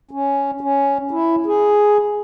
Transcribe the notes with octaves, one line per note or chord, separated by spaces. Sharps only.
C#4
C#4
E4
G#4